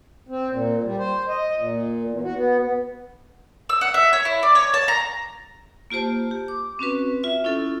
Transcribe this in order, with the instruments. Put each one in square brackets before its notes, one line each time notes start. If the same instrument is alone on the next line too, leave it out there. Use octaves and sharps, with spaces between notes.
[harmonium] C4
A#2
G3
C5
D#5
A#2
E2
F#4
B3
[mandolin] E6
F#5
E5
C#5
E4
D5
C#5
A5
A#5
[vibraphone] A#3 F4 G4 C5 A5
G4
D6
C4 C#4 F#4 B4
F4 E5
C#4 E4 F4 A4